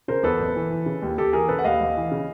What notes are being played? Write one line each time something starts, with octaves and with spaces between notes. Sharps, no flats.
C#3 A#4 C5
E2 A4 B4
F#1
E3
E3
C#3
D#2
D#2 G4 A4
E3 G#4 A#4
C#3 A4 B4
F#5
D#2 D#5 F5
D#2
E3
C#3